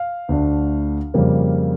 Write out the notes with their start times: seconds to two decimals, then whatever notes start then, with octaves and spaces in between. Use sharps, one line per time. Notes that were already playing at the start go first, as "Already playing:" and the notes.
Already playing: F5
0.29 D2 D3 A3 D4
1.14 F2 C#3 G3 A#3